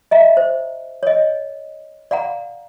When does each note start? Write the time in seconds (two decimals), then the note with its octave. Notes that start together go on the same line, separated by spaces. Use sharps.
0.11 D#5 E5 A#5
0.37 C5
1.03 C#5 D#5
2.11 D5 F5 F#5 A#5